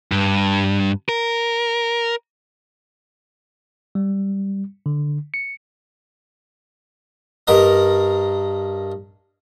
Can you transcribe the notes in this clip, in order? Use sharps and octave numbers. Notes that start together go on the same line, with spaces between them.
G2
A#4
G3
D3
C#7
G2 A#4 D#5